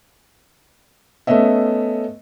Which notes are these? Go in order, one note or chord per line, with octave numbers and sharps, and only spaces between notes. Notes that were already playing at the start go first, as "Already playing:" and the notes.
A3 B3 C#4 D#5 E5